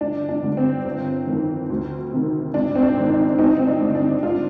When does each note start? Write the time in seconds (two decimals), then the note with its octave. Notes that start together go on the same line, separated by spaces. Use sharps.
0.01 G1 D4
0.29 D4
0.43 G2 D3
0.57 C4
0.85 G1
1.27 F2 D#3
1.70 D2
2.12 C3 D#3
2.54 G#1 D4
2.76 C4
2.82 D4
2.96 G#2 D#3
3.10 D4
3.27 D4
3.38 G1 C4 D#4
3.57 C4
3.67 D4
3.80 G2 D3
3.95 D4
4.23 G#1 D4 F4